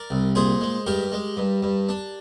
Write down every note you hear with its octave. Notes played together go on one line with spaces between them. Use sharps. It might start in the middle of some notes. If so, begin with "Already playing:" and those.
Already playing: A#4 D5
C2
A#2 G#4 C5
G#3
G2 G4 A#4
G#3
G2
G2
D4